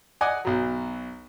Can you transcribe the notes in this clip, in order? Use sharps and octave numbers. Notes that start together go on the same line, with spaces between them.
D5 D#5 F#5 G#5
B1 F#3